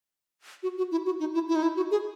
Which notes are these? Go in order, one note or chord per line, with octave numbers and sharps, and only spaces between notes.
F#4
F#4
E4
F#4
D#4
E4
E4
D#4
E4
F#4
G#4